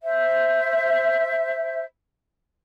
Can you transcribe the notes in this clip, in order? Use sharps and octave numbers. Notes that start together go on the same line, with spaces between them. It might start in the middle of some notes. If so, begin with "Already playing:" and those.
C5 E5